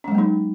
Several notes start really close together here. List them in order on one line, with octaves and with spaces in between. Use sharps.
C#4 G#3 F#3 A#3 D#4